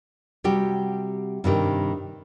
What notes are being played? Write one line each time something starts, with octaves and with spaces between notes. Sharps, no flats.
C3 G3 F#4 G4
G2 C3 D#3 G4